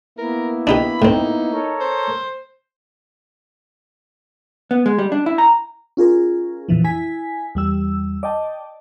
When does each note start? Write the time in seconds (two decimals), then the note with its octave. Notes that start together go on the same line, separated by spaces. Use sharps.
0.18 A#3 B3 E4 A#4
0.67 D4 D#4 G4 B5
1.02 A2 C4 D#4
1.52 A4 A#4 C#5
1.80 C5
4.71 B3
4.86 G#3
4.99 G3
5.12 D4
5.26 E4
5.38 A#5
5.97 C#4 F4 G#4 A#4
6.69 F2 A#2 E3 F3
6.84 E4 G#5 B6
7.55 E2 G3 E6
8.23 D5 D#5 G5 A5